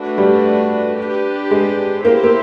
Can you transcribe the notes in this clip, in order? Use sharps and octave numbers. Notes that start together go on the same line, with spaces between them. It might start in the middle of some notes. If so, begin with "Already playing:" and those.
Already playing: A3 D4 F#4 B4
G3
D4 G4 B4
G#3
A#3 B3 E4 G4 C5 E5
A#3